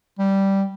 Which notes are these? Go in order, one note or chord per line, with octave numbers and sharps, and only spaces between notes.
G3